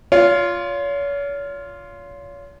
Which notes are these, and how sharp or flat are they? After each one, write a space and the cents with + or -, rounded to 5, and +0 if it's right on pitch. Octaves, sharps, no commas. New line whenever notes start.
F4 +0 C#5 +40